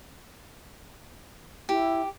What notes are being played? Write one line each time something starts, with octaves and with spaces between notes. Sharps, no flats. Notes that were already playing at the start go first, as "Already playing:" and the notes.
E4 G4